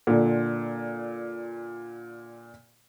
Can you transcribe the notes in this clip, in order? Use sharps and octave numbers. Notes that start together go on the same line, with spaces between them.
A#2 D3